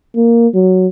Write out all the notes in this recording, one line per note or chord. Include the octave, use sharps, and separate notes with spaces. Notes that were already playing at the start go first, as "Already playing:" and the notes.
A#3
F#3